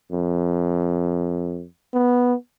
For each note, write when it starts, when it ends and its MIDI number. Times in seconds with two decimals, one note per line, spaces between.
0.12 1.66 41
1.94 2.34 59